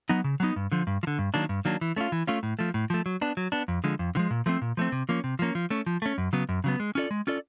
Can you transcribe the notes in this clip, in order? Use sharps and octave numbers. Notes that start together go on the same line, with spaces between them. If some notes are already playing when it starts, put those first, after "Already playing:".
F#3 B3 D#4
C#3
F#3 B3 D#4
G2
D3 F3
G2
F3
D3
G2
D#3 F#3 A#3 D4
G2
D#3 F#3 A#3 D4
E3
A3 C#4 F4
E3
A3 C#4 F4
A2
F3 A3
A2
F3 A3
F#3
B3 D4
F#3
B3 D4
F2
D3 F3 G#3
F2
D3 F3 G#3
A#2
F3 A3 C4
A#2
F3 A3 C4
C3
F3 A#3 C#4
C3
F3 A#3 C#4
F3
A3 C#4
F3
A3 C#4
F#2
C#3 F#3 B3
F#2
C#3 F#3 B3
G#3
C#4 F4 A4 D5
G#3
C#4 F4 A4 D5